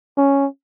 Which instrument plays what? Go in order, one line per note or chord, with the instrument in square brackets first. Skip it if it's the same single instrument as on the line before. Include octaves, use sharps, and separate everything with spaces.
[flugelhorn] C#4